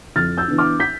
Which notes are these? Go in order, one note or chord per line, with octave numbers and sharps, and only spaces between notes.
F2 F6 A6
E6 G6
E3 B3 D4
D6 F6
G6 B6